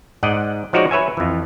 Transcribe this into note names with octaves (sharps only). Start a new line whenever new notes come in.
G#2 D5 D#5 F#5
F3 G#3 D#4 F#4 C#5 D5
B4 C#5 E5 G#5
F2 E3